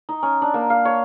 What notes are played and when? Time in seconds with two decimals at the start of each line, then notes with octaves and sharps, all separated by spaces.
0.09 D#4
0.23 C#4
0.42 D4
0.54 A#3
0.70 F5
0.85 C#5